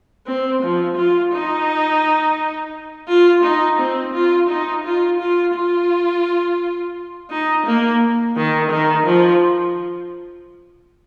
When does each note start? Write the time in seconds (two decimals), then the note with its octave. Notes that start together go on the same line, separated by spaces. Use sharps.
0.26 C4
0.62 F3
0.97 F4
1.32 D#4
3.08 F4
3.43 D#4
3.78 C4
4.13 F4
4.49 D#4
4.84 F4
5.19 F4
5.54 F4
7.30 D#4
7.66 A#3
8.36 D#3
8.70 D#3
9.06 F3